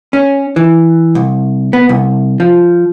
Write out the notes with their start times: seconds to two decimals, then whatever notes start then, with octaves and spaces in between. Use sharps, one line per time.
0.13 C#4
0.56 E3
1.15 C2
1.73 B3
1.89 C2
2.40 F3